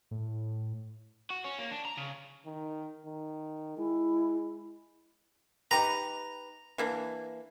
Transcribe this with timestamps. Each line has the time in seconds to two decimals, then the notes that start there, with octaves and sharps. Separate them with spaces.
0.11 A2
1.30 F#4
1.45 C#4
1.59 A#3
1.71 D4
1.85 A#5
1.98 C#3
2.46 D#3
3.05 D#3
3.77 G#3 E4
5.71 D#4 G4 B4 A#5
6.78 E3 A#3 D4